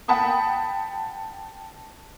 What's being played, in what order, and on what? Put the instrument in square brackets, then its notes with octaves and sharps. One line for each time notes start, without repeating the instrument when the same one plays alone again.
[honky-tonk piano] F#5 G5 A5 B5 D#6